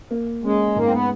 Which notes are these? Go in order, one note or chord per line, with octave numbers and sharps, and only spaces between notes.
A#3
G#3 C#4
G#2 A#3
C4
B3